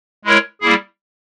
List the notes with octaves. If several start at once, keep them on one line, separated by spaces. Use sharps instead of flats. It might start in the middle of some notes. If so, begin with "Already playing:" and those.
G#3 E4 A#4 C#5
G3 A#3 E4 G#4